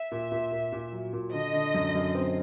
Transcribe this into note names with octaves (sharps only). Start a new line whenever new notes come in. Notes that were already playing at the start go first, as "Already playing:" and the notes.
Already playing: E5
A#2
A#2
A#2
A#2
F#3
A#2
D3 D#5
D3
F#2
F#2
C4